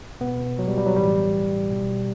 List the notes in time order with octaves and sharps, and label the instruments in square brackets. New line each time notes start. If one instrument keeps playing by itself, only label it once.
[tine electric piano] B2 B3
F#3
G3
G3
F#3
A2 E3 G3
B2